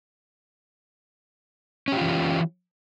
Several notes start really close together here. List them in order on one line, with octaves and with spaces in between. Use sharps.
C#4 G4 F4 E3